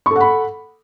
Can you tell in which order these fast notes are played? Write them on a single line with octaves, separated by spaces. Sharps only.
C#6 A4 F#5 B5